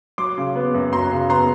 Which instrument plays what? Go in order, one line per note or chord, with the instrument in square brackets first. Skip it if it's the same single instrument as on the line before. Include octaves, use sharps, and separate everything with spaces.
[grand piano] F#3 C6 D6
C#3
B3
F#2
F#3 A#5 C6
C#3
B3 A#5 C6